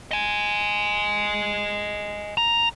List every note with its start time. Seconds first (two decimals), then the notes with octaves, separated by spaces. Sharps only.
0.11 D#5 G#5
2.37 A#5